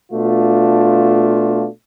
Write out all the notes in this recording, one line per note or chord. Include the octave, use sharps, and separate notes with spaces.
B2 A3 D4 F4